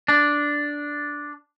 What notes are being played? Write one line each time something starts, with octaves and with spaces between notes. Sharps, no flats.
D4